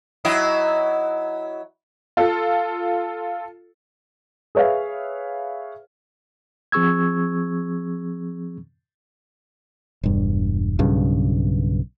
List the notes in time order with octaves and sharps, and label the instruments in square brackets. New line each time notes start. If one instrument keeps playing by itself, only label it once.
[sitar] F#3 E4 D#5
[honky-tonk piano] F4 A4
[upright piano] G#4 B4 C#5 E5 F5
[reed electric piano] F3 C4 G#4 C#6 E6 G#6
[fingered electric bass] E1 G2
B1 G2 C#3